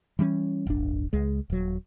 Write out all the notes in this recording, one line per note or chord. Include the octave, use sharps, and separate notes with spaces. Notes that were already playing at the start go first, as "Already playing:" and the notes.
E3 G3 C4 C#4
D1 G1 D4
C#2 G#3
D#1 F#3